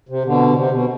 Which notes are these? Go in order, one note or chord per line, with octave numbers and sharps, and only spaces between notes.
C3
B2 D3
C3
B2